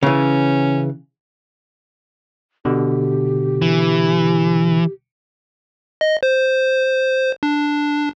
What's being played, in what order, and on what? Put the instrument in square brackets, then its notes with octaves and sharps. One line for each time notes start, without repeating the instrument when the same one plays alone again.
[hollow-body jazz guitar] C#3 E3 [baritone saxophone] C#4
[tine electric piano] B2 D3 [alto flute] G4
[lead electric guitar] E3
[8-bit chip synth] D#5
C5
D4